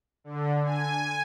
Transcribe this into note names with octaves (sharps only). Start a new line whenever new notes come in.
D3
G#5